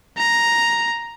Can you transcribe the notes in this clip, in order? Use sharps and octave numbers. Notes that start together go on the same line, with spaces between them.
A#5